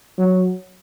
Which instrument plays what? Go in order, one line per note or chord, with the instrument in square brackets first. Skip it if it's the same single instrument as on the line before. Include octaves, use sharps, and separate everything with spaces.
[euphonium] F#3